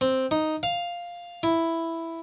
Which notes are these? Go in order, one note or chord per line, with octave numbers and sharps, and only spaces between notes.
C4
D#4
F5
E4